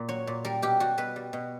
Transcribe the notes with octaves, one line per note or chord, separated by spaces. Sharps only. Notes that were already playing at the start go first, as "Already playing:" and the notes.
Already playing: A#2
F#3 C#5
A#2
G3 A#4
B2 G4
G3 F#4
B2 B4
G3
B2